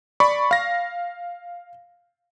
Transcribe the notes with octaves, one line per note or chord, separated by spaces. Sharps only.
D5 B5 C#6
F5 A#6